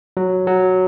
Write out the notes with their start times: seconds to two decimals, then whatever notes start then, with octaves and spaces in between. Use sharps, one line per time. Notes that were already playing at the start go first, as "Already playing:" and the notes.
0.17 F#3
0.47 F#3